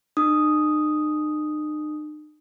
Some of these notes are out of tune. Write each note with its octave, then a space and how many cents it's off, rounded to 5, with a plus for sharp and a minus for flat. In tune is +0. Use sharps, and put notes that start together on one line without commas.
D#4 -45 D#6 +0